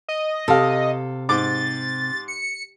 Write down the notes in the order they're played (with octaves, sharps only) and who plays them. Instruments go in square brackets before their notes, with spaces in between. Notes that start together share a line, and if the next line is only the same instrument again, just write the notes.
[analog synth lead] D#5
[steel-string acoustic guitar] C3 [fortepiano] A4 F5
[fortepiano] G#2 D6 [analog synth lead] A6
[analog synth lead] C#7